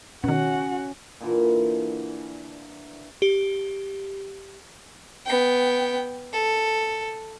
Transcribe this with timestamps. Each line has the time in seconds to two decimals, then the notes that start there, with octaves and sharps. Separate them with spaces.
0.24 B2 D#3 C#4 F#4 F#5
1.21 A#2 D3 E3
3.22 G4
5.26 B3 G5
6.33 A4